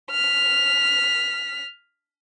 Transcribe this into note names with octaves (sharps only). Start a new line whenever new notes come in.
F6 B6